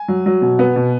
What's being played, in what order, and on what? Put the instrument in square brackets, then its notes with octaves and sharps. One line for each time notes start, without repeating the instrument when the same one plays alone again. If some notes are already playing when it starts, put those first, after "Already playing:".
Already playing: [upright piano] G#5
F#3
F#3
B2
B3
B2